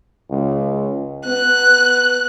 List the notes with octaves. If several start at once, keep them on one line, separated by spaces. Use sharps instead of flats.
C#2
B3 F#6